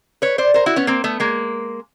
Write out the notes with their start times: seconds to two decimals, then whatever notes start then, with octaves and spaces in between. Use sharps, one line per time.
0.22 B4 C#5
0.38 C5 D5
0.54 A#4 C5
0.66 E4 F#4
0.76 B3 C#4
0.87 A#3 C4
1.04 A3 B3
1.20 G#3 A#3